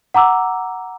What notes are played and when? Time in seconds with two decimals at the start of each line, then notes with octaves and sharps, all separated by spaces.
0.14 F#5 A#5 D6 E6